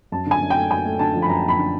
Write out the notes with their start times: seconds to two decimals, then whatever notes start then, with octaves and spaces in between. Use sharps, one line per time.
0.12 F#2 A5
0.27 D3 G#5
0.41 F#2
0.50 G5
0.56 A3
0.70 F#2 G#5
0.85 A3
0.99 D3 A5
1.14 F3
1.22 B5
1.29 F#2 A#5
1.44 F3 B5
1.59 D3